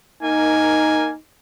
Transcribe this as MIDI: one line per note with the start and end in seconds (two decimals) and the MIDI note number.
0.23 1.12 58
0.23 1.17 63
0.23 1.12 70
0.23 1.12 80